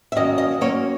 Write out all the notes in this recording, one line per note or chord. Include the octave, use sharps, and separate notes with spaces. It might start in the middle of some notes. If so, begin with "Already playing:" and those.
E5
D#3 F#3 A#3 C#4 D#5
D#5
F#3 A#3 C#4 C#5